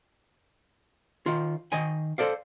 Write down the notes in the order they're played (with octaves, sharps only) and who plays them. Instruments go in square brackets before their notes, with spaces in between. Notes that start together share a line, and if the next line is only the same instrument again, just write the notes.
[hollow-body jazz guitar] D#3 F4
D#3 D#5 G#5
A4 C5 D5 F5